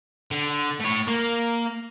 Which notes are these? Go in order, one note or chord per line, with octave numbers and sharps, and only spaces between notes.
D3
A3 C#5
A#3